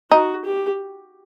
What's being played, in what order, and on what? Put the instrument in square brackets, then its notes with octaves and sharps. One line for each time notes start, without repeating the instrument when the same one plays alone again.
[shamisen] D#4 [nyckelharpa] F#4
[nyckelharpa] G4